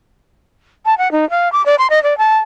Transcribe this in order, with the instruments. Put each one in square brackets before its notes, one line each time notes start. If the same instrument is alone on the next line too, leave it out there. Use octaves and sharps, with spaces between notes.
[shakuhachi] A5
F#5
D#4
F5
D6
D5
C6
D#5
D5
A5